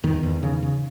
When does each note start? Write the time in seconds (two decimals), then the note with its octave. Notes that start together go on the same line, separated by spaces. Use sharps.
0.04 E2 D#3
0.23 E2
0.43 C#3
0.62 C#3